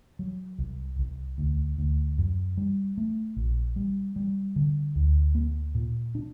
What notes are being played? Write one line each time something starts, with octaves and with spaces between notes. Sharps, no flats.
F#3
C2
C2
D2
D2
F#2
G3
A3
A#1
G3
G3
D3
D2
A#3
A#2
D4